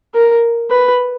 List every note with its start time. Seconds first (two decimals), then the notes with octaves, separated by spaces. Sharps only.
0.14 A#4
0.71 B4